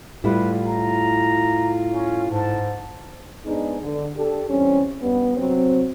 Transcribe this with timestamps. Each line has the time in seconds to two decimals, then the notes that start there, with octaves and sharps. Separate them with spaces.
0.24 A2 G3 E4 F4 B4
0.66 A#5
1.92 C#4
2.30 G#2 A5
3.45 G#2 B3 D4 D#4 G#4
3.82 D3
4.16 D4 G4 A4
4.48 E2 G3 C4 C#4
5.01 G2 B3
5.37 C3 F#3 C4